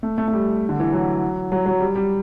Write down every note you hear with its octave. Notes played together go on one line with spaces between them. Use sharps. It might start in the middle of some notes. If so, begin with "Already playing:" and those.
A3
A3
A3
G3
D3
E3
F#3
F#3
F#3
G3
G3